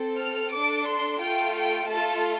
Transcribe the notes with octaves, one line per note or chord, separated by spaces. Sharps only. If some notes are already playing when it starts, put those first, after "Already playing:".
Already playing: C4 A4
F6
D4 A4 D6
C6
A3 F4 A4 G5
G5
A3 F4 A4 A5